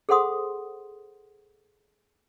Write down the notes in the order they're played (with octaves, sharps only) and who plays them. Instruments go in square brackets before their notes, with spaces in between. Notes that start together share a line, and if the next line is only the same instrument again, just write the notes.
[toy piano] G#4 A4 C5 F#5 C6 D#6